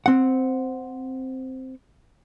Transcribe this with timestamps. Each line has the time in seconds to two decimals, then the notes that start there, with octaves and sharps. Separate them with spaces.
0.06 C4 F#5